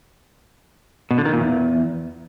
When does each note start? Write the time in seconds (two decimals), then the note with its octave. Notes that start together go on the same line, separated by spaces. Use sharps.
1.11 B2
1.18 D3
1.25 D#3
1.33 A#2
1.40 E2